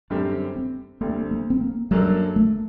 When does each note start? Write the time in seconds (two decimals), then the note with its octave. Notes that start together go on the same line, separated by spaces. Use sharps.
0.10 F#2 D3 G3 C4 D4 G4
0.56 C4
1.01 D2 D3 G3 A#3 C4
1.31 A#3
1.50 C4
1.61 A#3
1.91 F#2 F#3 G3 A#3 D4 A4
2.36 A3